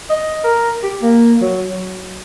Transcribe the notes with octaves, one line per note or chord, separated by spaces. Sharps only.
D#5
A#4
G4
A#3
F#3
F#3